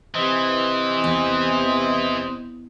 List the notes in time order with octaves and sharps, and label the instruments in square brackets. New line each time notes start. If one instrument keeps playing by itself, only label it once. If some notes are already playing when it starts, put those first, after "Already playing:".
[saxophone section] C3 C5 D#5 [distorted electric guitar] E3
[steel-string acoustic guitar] E2